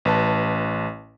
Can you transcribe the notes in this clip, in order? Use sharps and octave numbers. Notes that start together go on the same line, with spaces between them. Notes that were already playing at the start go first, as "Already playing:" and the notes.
A1 B4 A5